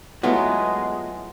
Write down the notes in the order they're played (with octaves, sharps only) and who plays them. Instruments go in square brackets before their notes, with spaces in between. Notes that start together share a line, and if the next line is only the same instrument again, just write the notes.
[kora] F#3 A3 [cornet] G#3 [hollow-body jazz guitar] B3 E4 F4